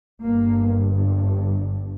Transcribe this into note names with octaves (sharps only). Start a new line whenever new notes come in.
G1 G2 A#3